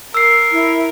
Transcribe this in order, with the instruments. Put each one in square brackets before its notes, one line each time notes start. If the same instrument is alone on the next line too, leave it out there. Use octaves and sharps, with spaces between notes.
[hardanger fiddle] A#4 [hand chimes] E6 C7
[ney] E4